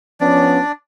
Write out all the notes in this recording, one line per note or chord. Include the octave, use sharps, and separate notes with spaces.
F3 B3 C#4 D4 D5